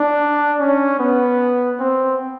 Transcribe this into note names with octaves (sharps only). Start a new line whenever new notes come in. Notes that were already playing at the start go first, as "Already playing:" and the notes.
Already playing: D4
C#4
B3
C4